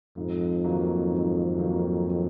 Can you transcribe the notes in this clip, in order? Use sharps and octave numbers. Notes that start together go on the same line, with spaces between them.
F2 G#2
D#3 F#3 A#3
G#2
D#3 F#3 A#3